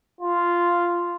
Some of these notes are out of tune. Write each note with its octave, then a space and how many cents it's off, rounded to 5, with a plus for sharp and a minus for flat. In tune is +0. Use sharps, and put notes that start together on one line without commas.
F4 -5